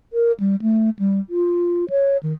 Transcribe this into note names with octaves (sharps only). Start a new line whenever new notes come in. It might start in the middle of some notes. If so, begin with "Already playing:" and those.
A#4
G3
A3
G3
F4
C#5
D#3